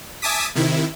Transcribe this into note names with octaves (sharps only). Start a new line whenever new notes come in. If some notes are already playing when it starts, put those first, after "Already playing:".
E5 G#5 A5 D6 D#6 B6
C3 D#3 E4